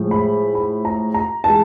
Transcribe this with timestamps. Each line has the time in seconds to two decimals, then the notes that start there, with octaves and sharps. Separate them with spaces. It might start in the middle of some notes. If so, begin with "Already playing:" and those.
Already playing: A2 F3 G#3
0.11 B5
0.55 B5
0.85 A#5
1.14 A#5
1.44 E3 G#3 A5